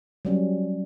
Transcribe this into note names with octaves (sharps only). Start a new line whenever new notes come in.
F#3 G3 C#4